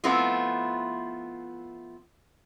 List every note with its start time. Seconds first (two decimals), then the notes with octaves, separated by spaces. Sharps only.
0.04 F3 A3 B3 C4 E4 F4